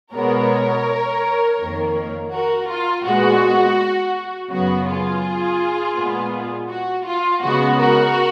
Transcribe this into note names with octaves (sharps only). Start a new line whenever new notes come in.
B2 G#3 B3 A#4 C#5
F2 D#3 A#3
F#4 A#4
F4
A#2 G#3 B3 F#4
F#2 C#3 F#3 B3 F#4
F4 G#4
A#2 G#3 B3
F#4
F4
C#3 G#3 B3 F#4
F#4 A#4